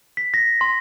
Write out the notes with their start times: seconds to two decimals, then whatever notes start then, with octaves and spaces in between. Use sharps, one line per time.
0.17 B6
0.34 A#6
0.61 C6